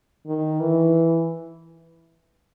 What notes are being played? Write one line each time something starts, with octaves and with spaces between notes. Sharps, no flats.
D#3
E3